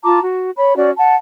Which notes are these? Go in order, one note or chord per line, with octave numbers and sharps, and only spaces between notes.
F4 A5 A#5 D6
F#4
C#5 B5
C#4 F#4 D5
F#5 A5